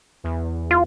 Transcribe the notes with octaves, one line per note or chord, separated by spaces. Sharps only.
E2
F4